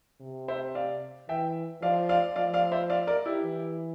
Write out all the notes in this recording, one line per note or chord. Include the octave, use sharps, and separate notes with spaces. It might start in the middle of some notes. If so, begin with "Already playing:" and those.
C3
C5 E5
D5 F5
E3 E5 G5
F3 D5 F5
D5 F5
F3 D5 F5
D5 F5
C5 E5
D5 F5
A#4 D5
E4 G4
E3